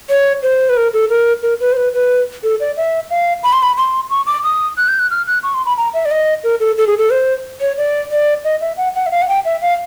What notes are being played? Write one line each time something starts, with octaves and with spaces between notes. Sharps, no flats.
C#5
C5
B4
A#4
A4
A#4
A#4
B4
C5
B4
B4
A4
D5
E5
F5
B5
C6
B5
C6
C#6
D6
D#6
F#6
G6
F#6
F6
F#6
C#6
C6
B5
A#5
E5
D5
D#5
A#4
A4
A4
G#4
A4
C5
C#5
D5
D5
D#5
E5
F#5
F#5
E5
F5
F#5
G5
E5
F5